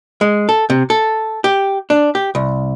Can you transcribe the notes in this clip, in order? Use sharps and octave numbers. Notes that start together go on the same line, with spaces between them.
G#3
A4
C3
A4
G4
D4
G4
C2